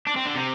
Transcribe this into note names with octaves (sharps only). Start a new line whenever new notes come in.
D4
C4
D3
C3